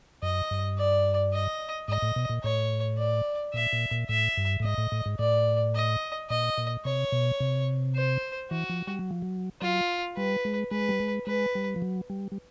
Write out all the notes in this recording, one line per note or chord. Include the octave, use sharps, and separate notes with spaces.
F#2 D#5
G2
D5
D#5
G#2 D#5
A2
B2
A#2
A2 C#5
D5
A#2 E5
A#2
A#2
A2 E5
G2
A2
G#2 D#5
A2
A2
G#2
A2 D5
D#5
A#2 D#5
A#2
C3 C#5
B2
C3
C5
E3 F#4
F3
G3
F#3
F3
F#3
F#3 F4
G3 B4
G#3
G#3 B4
G3
G#3
G#3 B4
G3
F3
F#3
G3
G3